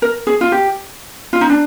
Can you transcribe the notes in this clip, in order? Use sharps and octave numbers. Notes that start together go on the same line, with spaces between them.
A#4
G#4
F4
G4
F4
D#4
D4